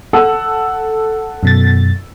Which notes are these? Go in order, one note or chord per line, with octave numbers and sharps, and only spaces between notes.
A4 F#5 E6
F#2 B2 A6